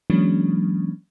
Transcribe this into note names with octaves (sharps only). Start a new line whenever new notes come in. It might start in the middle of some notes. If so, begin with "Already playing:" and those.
E3 F#3 G#3 A#3 C#4 D4